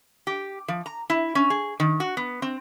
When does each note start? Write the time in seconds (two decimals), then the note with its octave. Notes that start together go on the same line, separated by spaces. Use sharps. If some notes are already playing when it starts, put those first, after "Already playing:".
0.27 G4
0.68 F3
0.86 A#5
1.10 E4
1.35 C#4
1.50 G#4
1.80 D#3
2.00 F#4
2.17 B3
2.42 C4